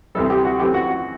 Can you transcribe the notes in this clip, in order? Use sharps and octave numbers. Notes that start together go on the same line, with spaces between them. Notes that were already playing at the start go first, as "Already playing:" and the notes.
D2 C3 E3 G3 A4
G4
F#4
F#2 E3 A3 C4 G4
F#4
F#4